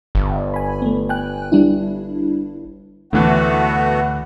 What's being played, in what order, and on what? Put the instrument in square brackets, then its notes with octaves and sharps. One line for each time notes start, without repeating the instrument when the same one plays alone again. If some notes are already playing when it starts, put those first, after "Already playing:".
[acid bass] G1
[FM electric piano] G#5 B5
A3 B3
G5 G#5 F#6
G3 D4 E4
[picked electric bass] D2 [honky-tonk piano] A2 E3 [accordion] A3 B3 F#4 [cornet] F#5